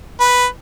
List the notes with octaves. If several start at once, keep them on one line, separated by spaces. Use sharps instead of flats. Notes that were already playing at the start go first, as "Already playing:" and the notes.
B4